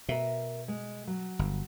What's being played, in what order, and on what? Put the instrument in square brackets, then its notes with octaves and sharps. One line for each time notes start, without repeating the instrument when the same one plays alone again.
[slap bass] B2 [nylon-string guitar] A#4 E5
[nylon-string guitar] G#3
F#3
[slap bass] G1